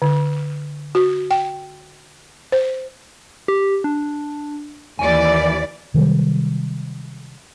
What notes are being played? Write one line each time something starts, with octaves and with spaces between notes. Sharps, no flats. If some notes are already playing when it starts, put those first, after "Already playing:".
D3
F#4
G5
C5
G4
D4
D#2 E3 D5 G#5
C3 D#3 F#3 G3